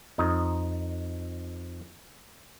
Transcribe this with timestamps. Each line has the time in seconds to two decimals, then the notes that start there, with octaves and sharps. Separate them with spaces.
0.18 F2 D#4